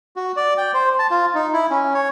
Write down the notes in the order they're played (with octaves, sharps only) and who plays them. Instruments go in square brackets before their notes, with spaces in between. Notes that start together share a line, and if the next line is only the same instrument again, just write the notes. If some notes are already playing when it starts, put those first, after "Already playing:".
[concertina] F#4
D5
G5
C5
A5
F4
D#4
E4
C#4
C#5